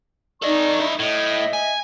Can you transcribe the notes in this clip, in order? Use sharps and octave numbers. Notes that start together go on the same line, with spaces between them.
D#4 A4 D5 D#5 C#6
E4 D#5
A2 D#5 E5
G#5